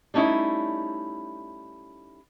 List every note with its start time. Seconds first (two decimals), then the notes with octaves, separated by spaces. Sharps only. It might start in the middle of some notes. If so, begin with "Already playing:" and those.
0.14 G3 A3 C#4 D#4 E4